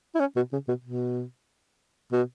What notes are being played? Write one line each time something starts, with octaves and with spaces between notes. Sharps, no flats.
E4
C#4
B2
C#3
B2
B2
B2